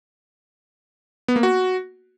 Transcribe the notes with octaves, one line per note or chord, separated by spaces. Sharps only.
B3
A#3
F#4